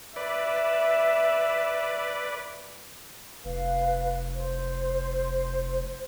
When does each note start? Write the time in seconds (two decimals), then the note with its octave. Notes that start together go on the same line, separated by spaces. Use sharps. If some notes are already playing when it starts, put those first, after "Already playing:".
0.16 B4 D5 E5
3.45 F1 B4 F5
4.33 C5